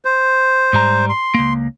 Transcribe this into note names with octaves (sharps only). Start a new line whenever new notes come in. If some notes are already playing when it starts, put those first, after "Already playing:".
C5
G#2 G3 A#5
C6
C#2 A#3